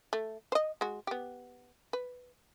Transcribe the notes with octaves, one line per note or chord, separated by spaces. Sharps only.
A3
C5 D#5
G#3 F#4
B3 G4
B4